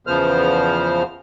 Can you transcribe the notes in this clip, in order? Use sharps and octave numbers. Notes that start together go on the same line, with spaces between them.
E2 C#3 F3 B3 C5 F6